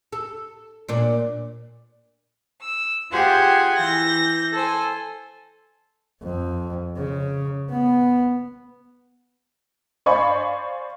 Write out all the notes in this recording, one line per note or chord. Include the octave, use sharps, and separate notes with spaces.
A4
A#2 D4
E6
F4 G4 G#4 C5 F#5 G#5
E3 G6 A#6
A4 C5 G#5
F2
C#3
B3
C5 D5 F5 G#5 B5 C#6